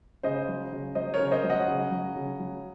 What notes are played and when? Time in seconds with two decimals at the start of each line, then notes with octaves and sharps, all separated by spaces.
0.23 C#3 C5 D#5
0.48 F#3
0.72 C#3
0.95 F#3 C5 D#5
1.14 A#4 C#5
1.20 C#3
1.31 C5 D#5
1.44 F#3
1.50 D#5 F#5
1.68 C#3
1.91 F#3
2.15 C#3
2.39 F#3